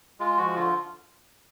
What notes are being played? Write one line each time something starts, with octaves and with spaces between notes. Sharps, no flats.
G#3 F4
F3 F#4
D3 F4